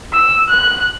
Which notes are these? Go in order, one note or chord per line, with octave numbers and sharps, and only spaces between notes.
E6
F#6